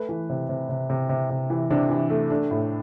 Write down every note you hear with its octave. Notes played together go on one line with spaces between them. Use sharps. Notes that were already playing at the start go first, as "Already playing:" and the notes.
Already playing: A3 B4
E3
C3
C3
C3
C3
C3
C3
E3
C3 D4
E3
A3
A3 D4
A2